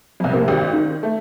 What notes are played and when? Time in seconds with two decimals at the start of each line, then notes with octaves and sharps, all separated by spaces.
0.20 C2 F2
0.32 A2 C3 F3 A#3
0.48 G#1 G4
0.73 D#3
1.03 A3